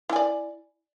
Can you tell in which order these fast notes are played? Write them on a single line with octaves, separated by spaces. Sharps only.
E4 G#5 D5